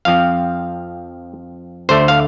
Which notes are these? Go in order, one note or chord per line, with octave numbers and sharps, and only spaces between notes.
F2 F3 C4 F5
D2 D3 A3 C5
F5